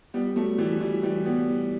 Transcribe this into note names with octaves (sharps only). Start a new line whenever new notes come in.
G3 B3
F#3 A3
E3 G3
E3 G3
E3 G3
G3 B3